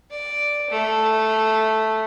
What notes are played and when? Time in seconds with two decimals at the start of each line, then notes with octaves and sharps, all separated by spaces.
0.10 D5
0.70 A3